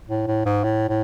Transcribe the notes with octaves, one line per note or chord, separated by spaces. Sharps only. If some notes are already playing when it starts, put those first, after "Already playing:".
A2
A2
G#2
A2
A2